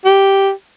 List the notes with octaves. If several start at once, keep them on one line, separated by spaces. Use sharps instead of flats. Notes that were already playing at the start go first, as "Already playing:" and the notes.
G4